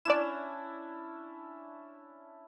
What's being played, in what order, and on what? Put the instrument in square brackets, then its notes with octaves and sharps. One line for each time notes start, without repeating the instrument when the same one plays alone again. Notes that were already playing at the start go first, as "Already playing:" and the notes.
[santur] C#4 D4 E4 [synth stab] D5 E7